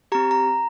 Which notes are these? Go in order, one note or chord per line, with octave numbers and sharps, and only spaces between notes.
C4 G4 A#5
A#5